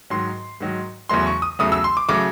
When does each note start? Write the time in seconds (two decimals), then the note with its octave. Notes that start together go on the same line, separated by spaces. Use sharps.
0.10 G#2 D#3 F#3 C6
0.61 G#2 D#3 F#3
1.09 E2 C#3 F#3 A3 C6
1.27 C#6
1.42 D#6
1.59 E2 C#3 F#3 A3 D#6
1.72 E6
1.84 C6
1.97 D6
2.08 C#3 F#3 A3 D6